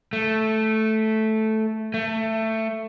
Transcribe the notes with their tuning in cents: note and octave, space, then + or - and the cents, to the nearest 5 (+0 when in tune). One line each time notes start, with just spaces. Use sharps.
A3 -5
A3 +15